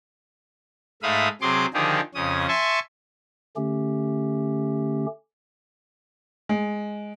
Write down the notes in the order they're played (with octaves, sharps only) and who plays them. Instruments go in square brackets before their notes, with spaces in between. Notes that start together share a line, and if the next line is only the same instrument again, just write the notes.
[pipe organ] G#2 A3 E5 F5 B5 D#6
C3 F#3 G#4 C6 D6
D3 D#3 F3 D#4 G4 G#4
F2 C#3 C#4 D#6
E5 G#5 A5 C6 C#6
D3 A3 C#4 G4
[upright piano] G#3